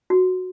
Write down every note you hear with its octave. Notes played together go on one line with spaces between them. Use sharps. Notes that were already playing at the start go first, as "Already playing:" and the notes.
F#4